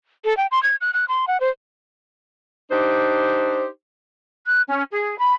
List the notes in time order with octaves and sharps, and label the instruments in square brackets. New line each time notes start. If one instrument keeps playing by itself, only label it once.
[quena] A4
G5
C6
G#6
F#6
F#6
C6
F#5
C5
[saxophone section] D4 D#4 G4 C5
[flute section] F#6
C#4
G#4
B5